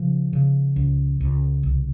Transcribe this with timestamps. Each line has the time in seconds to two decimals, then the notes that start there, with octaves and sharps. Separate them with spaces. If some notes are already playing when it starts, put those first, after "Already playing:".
Already playing: C#3 F3
0.33 C#3
0.76 C#2
1.20 C#2
1.63 C2